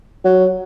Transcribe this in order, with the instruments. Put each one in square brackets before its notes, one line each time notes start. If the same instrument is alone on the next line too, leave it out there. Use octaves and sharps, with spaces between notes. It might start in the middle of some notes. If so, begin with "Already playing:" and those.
[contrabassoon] F#3